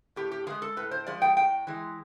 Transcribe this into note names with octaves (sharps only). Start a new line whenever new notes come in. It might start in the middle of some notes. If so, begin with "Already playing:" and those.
A2 G4
G4
F3 G#3 G#4
A4
A2 B4
C5
F3 G#3 D5
G5
A2 G5
E3 G#3